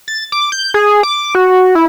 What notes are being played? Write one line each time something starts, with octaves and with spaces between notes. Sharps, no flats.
A6
D6
G6
G#4
D6
F#4
E4